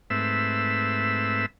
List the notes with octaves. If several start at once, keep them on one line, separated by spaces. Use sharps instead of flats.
G#2 A3 C4 B4 E5 E6